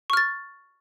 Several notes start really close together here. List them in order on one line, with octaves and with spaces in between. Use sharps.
C#6 F6 A6